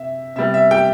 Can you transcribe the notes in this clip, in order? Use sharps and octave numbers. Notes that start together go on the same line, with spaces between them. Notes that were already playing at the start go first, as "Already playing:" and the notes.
Already playing: C3 E5
C3 G3 B3 E5
E5
G4 G5